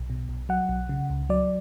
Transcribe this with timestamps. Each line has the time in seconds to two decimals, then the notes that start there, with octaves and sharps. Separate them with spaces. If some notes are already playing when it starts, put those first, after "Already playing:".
Already playing: B1
0.10 B2
0.29 B1
0.49 F#3 F#5
0.69 B1
0.89 C#3
1.10 C#2
1.29 F#3 D5